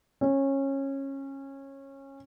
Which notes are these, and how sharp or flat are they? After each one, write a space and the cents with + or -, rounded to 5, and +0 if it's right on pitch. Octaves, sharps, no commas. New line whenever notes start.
C#4 -20